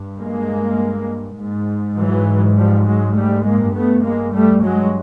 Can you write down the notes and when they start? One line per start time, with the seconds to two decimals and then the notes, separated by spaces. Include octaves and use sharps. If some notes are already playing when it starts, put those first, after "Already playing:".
Already playing: G2
0.20 G#3 A#3
1.38 G#2
1.97 E3 F#3
2.58 F3 G3
2.86 F#3 G#3
3.16 G3 A3
3.45 G#3 A#3
3.75 G2 A3 B3
4.05 G#3 A#3
4.34 G3 A3
4.64 F#3 G#3